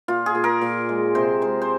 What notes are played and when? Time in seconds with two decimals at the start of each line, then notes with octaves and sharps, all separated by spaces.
0.08 A#2 F4
0.26 G#4
0.35 A#2
0.44 A#4
0.61 A#2
0.89 G#3
1.15 C3 C5
1.42 G#3 C5
1.62 C5